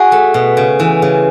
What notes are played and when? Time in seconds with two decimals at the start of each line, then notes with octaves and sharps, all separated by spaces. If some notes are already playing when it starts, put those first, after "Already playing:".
Already playing: F#4 G#4
0.12 A3
0.34 B2
0.57 C#3
0.80 E3
1.02 C#3